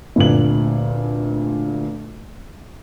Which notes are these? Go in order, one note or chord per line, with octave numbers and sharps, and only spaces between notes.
F1 D2 A#2 F#7